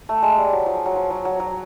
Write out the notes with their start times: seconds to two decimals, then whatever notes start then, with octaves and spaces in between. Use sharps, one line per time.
0.09 A3
0.22 G#3
0.38 G3
0.53 F#3
0.66 F3
0.86 F#3
0.96 F3
1.11 F#3
1.25 F#3
1.40 F#3